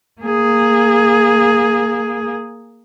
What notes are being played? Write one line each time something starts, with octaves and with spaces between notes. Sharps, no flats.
A#3 G#4